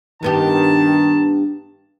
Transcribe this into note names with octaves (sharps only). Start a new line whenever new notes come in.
G2 D#3 B3 G4 A5